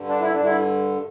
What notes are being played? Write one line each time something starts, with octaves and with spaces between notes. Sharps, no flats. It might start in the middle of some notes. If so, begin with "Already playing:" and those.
Already playing: G2 D3
D4
E4
D4
G2
D3 E4